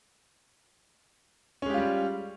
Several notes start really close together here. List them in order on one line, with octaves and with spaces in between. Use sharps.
C#4 G#3 G4 F4 G3